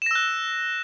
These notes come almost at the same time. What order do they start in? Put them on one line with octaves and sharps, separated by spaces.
E7 A#6 E6 F#6